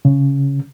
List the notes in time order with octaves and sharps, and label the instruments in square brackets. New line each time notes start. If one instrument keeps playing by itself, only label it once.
[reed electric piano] C#3